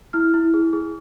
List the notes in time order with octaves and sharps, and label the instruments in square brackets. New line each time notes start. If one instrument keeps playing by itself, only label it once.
[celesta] E4 F6
E4
G#4
G#4